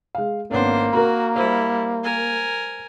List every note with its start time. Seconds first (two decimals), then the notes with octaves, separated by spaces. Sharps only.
0.15 G#3 F5
0.51 G#1 A#3 B3 C#4 D4 C5
0.93 F#4 A#4 A#5
1.36 G3 E4 C5
2.03 A#4 G#5